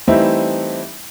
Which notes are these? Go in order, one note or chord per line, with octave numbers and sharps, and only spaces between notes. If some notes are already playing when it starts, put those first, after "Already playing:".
E3 G3 A3 C4 D#4 E5